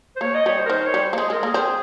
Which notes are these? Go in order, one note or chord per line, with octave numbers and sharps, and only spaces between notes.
C5
A#3 C#5
D#5
G3 C#5
C5
A#4
D#3 C5
C#5
G3
C5
A#3
G#3 G#4
G#3 A#4
A#3 G#4
C4